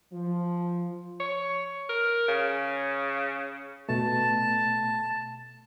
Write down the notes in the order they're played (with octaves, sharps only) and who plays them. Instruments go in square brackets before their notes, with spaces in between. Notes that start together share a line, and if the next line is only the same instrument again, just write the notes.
[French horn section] F3
[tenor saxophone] C#5
A#4
C#3
[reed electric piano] B2 A3 [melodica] A5